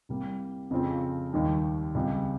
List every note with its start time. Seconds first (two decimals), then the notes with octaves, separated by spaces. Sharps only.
0.09 C2 C3 G3 A#3
0.71 F2 C#3 F3 C4 F4
1.33 D#2 D#3 G3
1.95 C#2 C3 G3